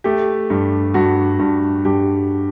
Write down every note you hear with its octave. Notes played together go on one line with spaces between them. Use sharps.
A3 G4
G2
G2 F#4
G2
G2 G4